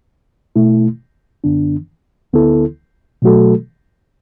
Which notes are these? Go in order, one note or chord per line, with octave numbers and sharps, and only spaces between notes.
B2 A3 E4
F#2 D3 B3 D4
D2 D3 B3 E4 A4
B2 F#3 A3 F#4 A4